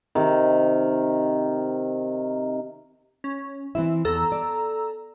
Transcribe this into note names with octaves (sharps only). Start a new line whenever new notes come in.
C3 D#3
C#4
E3 C4 E4 E5
E2 A4 A#5 E6
D5